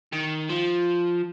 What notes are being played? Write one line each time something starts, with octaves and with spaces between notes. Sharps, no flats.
D#3
F3